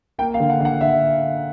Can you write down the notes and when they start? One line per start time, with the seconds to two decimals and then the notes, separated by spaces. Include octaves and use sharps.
0.18 A#3 G5
0.34 F5
0.40 D3
0.50 F#5
0.60 D3 F#5
0.81 D3 E5